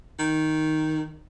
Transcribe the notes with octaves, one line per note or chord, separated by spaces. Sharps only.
D#3